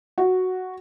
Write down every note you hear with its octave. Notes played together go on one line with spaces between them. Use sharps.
F#4